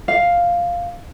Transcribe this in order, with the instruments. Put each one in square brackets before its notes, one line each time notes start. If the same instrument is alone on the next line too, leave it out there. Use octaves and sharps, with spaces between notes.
[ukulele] F5